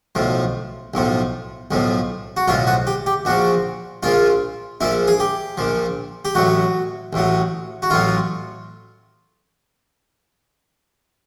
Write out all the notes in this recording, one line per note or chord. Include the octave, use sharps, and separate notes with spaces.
B1 A2 F3
B1 A2 F3
B1 A2 F3
F#4
B1 A2 F3 F4
F#4
G4
G4
A#1 A#2 F3 F#4
A#1 A#2 F3 F4
A#1 A#2 F3 E4
G#4
G4
A#1 A#2 F3
G4
A1 A2 F#3 F#4
A1 A2 F#3
F#4
A1 A2 F#3 F4